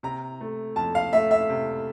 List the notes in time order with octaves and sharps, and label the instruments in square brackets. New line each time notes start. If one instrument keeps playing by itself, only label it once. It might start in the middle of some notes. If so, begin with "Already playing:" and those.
[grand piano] C3 A#5
A3
F2 A5
F5
A3 E5
E5
C3